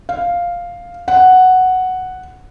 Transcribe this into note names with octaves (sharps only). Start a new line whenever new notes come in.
F5
F#5